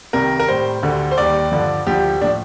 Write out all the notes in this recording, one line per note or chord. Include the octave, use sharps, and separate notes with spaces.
C2 C3 D#3 G3 A#4
A#4
A2 G3 C5
D2 D3 G3
C5
D#2 D#3 G3 D5
G2 D3 F3
D2 D3 F3 G4
A2 F3 D4